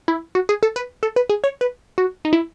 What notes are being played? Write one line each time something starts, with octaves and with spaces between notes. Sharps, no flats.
E4
F#4
G#4
A4
B4
A4
B4
G#4
C#5
B4
F#4
D#4
E4